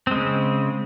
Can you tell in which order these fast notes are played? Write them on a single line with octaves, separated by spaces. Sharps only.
C4 G#3 C#3